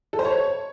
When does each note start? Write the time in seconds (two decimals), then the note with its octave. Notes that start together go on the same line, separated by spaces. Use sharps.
0.13 A4
0.19 C5
0.25 C#5